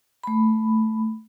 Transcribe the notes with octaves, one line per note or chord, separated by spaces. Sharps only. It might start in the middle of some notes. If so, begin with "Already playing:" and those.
A3 B5